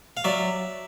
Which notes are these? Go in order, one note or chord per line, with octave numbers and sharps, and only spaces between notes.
F5
F#3 D5 E5